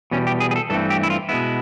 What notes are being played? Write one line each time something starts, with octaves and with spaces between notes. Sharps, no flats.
E2 B2 G3 C#4
G4
G#4
G#4
A4
G2 E3 A3 C4 A4
G4
E4
F4
B2 G#3 B3 E4